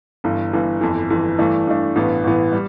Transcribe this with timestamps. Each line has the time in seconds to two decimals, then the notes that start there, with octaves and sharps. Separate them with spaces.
0.24 G1 G2 E3
0.53 G1 G2 E3
0.81 G1 F2 E3
1.10 G1 F2 E3
1.38 G2 E3 A3 D4
1.67 G2 E3 A3 D4
1.95 A1 G2 E3 B3
2.24 A1 G2 E3 B3
2.53 G3